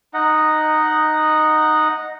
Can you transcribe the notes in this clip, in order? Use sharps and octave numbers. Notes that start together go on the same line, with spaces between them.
D#4 D#5 F#5